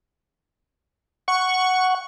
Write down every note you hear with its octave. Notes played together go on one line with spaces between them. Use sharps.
F#5 C#6